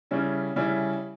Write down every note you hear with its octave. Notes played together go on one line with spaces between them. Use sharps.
C#3 G3 C#4 E4
C#3 G3 C#4 E4